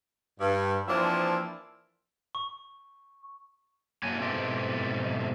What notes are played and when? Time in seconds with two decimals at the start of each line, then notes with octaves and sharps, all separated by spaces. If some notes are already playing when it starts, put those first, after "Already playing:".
0.40 G2
0.88 E3 F3 A#3 C4 D4 E5
2.35 C#6
4.03 A2 A#3 D4 F#4 C#5 G#5
4.22 G#2 B2 A3 C4 E4 G4